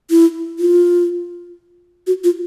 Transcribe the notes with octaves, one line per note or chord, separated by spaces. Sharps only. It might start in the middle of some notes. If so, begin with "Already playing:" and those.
E4
F4
F#4
F4